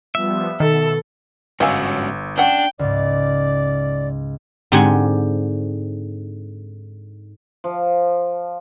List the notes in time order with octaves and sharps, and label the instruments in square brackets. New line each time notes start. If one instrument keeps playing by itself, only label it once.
[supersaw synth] F3 G3 B3 [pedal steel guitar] E5
[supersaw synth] B2 [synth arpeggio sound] D#3 [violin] A4
[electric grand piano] G1 E6 [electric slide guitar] G#2 C#4 F#4 [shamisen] D#5 F5 G#5
[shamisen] C#4 F#5 [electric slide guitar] D4 [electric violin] G5
[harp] C#2 G#2 [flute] D5
[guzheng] G#2 D3 C4 G4 F#5 G#5
[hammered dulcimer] F3